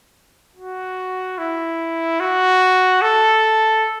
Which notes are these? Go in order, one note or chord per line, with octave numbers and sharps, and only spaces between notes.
F#4
E4
F#4
A4